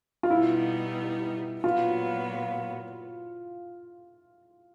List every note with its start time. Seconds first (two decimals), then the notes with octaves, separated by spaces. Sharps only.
0.23 F4
0.30 B2 G3 B3 D#4 E4
1.64 A#2 F#3 B3 F4